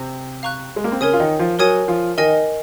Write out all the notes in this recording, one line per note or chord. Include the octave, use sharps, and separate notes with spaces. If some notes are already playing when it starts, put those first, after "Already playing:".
Already playing: C3 C4
F5 A#5 C#6 F#6
G#3
A#3
C4
C#3 C#4 A#4 C#5 G#5 D#6
F4
D#3 D#4
F3 F4
F#3 F#4 A#4 C#5 G#5 D#6
F3 F4
D#3 D#4 A#4 D#5 G#5